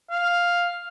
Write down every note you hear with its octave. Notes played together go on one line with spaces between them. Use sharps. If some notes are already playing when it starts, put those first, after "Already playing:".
F5